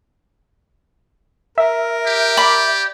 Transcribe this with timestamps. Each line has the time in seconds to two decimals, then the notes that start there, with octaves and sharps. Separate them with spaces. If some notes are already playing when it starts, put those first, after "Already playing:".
1.58 A#4 E5
2.07 G4
2.37 D5 B5